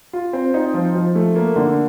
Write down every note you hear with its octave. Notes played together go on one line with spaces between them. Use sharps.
F4
C4
D#4
F3
F3
A3
A#3
D3